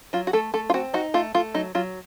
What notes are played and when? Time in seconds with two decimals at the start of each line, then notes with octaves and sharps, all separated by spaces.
0.13 F#3 F4
0.27 F#4
0.33 A3 A4
0.54 A3 A4
0.70 F4
0.74 C4 F#4
0.94 D#4 F#4
1.14 A3 F4
1.34 A3 F4
1.54 F#3 D#4
1.75 F#3 F4